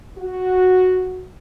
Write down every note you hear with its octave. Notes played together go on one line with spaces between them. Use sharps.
F#4